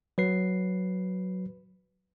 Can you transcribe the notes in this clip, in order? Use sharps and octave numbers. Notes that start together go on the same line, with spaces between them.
F#3 B4 C7